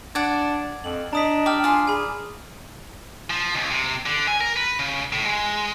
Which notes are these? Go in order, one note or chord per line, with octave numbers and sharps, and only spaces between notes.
D4 D5 F#5 G#6
F2 F#7
D4 D#5 A#5 D#6 B6
G4 D6 F6
F4 G#5 C6
G#4 G#5 B5
F3
C#2
C3
D3
G#5
A#4
B4
C#3
A2
G#3